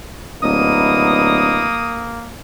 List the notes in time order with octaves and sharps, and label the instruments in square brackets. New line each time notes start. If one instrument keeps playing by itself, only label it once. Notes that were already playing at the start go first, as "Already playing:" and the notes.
[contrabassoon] D1 [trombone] A#3 [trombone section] B3 D#4 E4 [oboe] D#6